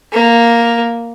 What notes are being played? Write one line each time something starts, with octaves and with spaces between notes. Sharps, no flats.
A#3